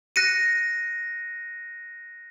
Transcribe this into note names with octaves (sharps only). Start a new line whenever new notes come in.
F#6 A#6 C#7 D#7